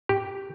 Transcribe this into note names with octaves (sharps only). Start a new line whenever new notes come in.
G4